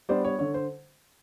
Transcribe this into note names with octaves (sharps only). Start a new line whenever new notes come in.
G3 B3 D4 C5 D5
C#5
D3 C#5
C5